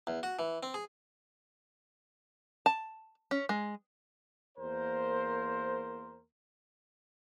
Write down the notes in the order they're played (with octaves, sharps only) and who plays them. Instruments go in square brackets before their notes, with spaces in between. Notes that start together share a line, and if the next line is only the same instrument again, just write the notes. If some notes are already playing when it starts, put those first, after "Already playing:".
[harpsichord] E2
F#4
E3
C4
G#4
[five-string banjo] A5
C#4
G#3
[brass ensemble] E2 A#3 A#4 C5